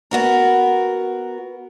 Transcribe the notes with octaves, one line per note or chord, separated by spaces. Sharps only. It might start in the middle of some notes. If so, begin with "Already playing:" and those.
B3 F#4 A#4